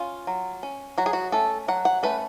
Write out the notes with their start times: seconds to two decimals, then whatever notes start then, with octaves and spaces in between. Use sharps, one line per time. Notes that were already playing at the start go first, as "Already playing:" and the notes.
Already playing: C#4 F4
0.27 F#3
0.63 C#4
0.98 F#3 F#4
1.06 G#4
1.13 F#4
1.32 A3 C#4 A4
1.68 F#3 F#5
1.85 F#5
2.03 A3 C#4 B4